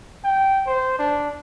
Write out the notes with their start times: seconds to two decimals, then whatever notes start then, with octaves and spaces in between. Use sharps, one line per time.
0.24 G5
0.66 C5
0.99 D4